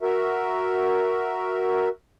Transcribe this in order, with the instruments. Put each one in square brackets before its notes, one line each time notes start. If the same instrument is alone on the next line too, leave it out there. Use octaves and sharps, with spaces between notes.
[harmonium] F#4 A#4 E5